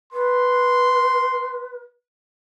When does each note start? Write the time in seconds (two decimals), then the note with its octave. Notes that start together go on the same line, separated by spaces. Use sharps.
0.13 B4 C6